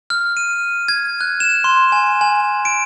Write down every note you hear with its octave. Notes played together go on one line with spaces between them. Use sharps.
F6
D#7
G#6
F#6
E7
C6
G#5
G#5
D7